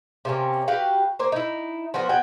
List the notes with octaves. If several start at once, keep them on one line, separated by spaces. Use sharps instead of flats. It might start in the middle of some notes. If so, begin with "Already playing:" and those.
C3 A#3 C#4
F#4 G4 B4 F5
A#3 C5
D#4 E4
F3 B3 F#4 A#4
B3 F#4 G5 G#5